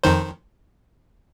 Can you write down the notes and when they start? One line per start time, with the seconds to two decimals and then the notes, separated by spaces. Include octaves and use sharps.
0.04 F2 D#3 C5